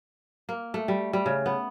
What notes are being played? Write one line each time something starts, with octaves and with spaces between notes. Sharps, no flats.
A#3
A3
G3
G3
C#3
B3